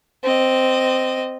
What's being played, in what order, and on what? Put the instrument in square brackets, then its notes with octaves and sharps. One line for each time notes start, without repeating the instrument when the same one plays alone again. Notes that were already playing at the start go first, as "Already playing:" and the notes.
[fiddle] C4 D#5